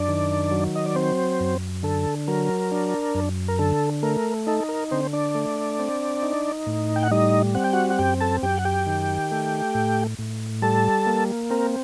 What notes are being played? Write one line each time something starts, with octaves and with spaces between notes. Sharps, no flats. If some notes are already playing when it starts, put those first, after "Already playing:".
Already playing: F#2 D4 D5
D#3
F#3
D#5
D5
C4 C5
F#2
D3 A4
F#3 A#4
D4
F#2
A#4
D3 A4
A3 A#4
D#4 A4
A#4
D3 C4 C5
D4 D5
A3
C4
D#4
A2
G5
F#5
G3 D#4 D#5
C4 F#5
G5
F#4 F#5
F#5
F#2 G4 G5
A4 A5
F#2 G4 G5
F#5
G4 G5
D#3
A3
A2
A2
G3 A4 A5
A#3
C4 A#4